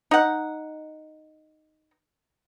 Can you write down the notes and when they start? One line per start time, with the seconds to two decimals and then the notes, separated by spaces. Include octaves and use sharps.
0.11 D#4 F#5